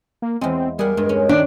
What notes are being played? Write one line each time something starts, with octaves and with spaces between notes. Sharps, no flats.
A#3
E2 G#3 C4
G3 G#4 A#4 F#5
G2 G#3
C#4
D#3 D4